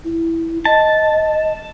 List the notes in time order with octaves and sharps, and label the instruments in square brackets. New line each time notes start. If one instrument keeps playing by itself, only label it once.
[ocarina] E4
[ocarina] D#5 [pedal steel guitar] A5